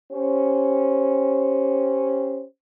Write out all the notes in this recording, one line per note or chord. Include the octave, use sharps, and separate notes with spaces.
C#4 G4 C5